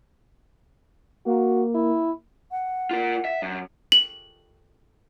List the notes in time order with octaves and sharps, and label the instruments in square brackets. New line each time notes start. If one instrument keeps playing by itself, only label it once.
[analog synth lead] A#3 [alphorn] F#4
[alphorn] E4
[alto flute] F#5
[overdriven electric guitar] F4 A#4
E5
F#2
[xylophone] F#7